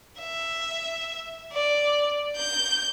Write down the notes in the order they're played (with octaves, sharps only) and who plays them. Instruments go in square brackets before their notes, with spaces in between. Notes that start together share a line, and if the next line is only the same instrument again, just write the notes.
[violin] E5
D5
G6